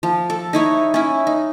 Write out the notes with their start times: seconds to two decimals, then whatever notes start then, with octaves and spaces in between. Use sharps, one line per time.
0.03 F3
0.30 A4
0.53 D#4 E4 C#5
0.94 C#4 E4
1.27 D#4